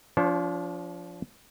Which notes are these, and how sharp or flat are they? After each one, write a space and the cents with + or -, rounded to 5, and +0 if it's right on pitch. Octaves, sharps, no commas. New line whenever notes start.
F3 +0 D4 -35 C5 +35